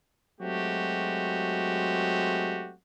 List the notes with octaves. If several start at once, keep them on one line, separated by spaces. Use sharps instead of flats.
F#3 G#3 A3 C4 F#4 G4